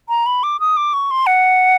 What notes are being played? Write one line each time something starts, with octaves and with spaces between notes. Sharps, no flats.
A#5
B5
D6
D#6
D6
C#6
C6
F#5